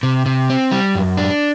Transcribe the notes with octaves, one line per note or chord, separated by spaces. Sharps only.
C3
C3
C4
G3
F#2
D4